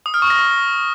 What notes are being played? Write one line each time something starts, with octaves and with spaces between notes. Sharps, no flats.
D#6
F6
C#6
A#6